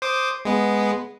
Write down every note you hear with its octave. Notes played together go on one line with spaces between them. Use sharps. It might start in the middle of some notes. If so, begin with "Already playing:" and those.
C5 D6 D#6
G#3 B3